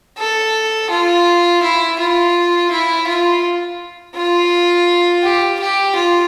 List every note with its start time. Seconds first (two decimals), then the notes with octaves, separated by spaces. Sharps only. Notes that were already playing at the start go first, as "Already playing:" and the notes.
0.18 A4
0.90 F4
1.63 E4
1.99 F4
2.70 E4
3.07 F4
4.15 F4
5.24 G4
5.60 G4
5.96 F4